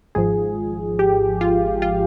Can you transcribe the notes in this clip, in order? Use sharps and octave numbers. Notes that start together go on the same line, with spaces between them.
G#1 G#2 F3 G#4
G4
F4
F4